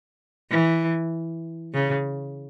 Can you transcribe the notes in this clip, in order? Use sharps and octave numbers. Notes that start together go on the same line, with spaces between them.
E3
C#3